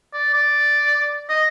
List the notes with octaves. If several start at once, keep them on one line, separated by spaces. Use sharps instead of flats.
D5
D5
D#5